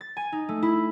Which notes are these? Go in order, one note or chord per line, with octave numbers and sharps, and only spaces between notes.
A6
G#5
D#4
A3
E4